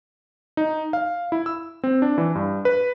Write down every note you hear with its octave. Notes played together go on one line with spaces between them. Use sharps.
D#4
F5
E4
E6
C4
D4
E3
G2
B4